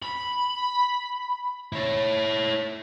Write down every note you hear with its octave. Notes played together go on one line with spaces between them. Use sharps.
B5
E4 C#5